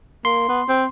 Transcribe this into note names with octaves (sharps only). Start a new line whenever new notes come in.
A#3 C6
B3
C4